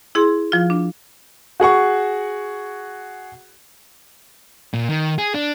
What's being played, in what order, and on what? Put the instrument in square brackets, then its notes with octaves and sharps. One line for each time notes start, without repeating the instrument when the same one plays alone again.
[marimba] E4 G#4 C6
F3 F4
D4
[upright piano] F#4 G#4 F#5 C#6
[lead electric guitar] A#2
D#3
G#4
D4